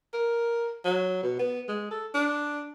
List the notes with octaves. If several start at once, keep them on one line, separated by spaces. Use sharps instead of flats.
A#4
F#3
B2
B3
G#3
A4
D4